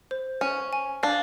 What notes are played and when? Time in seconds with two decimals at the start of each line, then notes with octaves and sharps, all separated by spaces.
0.11 C5
0.41 C#4 G#5
0.73 G#5
1.03 D4 F5